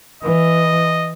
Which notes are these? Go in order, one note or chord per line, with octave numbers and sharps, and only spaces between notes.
E3 D#5